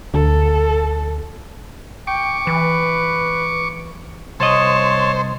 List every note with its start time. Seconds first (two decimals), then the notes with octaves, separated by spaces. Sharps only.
0.14 D2 A4
2.07 G5 C#6 D6
2.47 E3 B4
4.40 C2 C5 C#5 D#5 A5